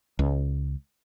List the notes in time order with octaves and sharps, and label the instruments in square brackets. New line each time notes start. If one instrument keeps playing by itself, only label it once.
[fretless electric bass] C#2